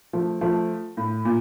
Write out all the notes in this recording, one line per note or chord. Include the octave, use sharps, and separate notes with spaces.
F3 A3
F3 A3
A2
A#2